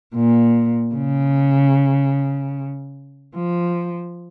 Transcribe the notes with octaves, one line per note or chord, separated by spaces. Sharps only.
A#2
C#3
F3